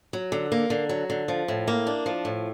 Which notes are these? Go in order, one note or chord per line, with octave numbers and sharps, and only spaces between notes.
F#3
D3
A#3
D3
F#3
D3
F3
A2
A#3
D4
F3
A2